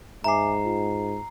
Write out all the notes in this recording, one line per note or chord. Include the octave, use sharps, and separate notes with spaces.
G#2 E5 G#5 A#5 D6 C7
F4